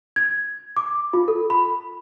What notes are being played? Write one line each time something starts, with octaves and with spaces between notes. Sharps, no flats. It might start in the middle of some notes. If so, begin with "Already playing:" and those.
G#6
D6
F4
A4
B5